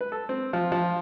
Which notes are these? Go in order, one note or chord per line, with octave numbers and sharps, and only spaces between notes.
B4
A4
C4
F3
F3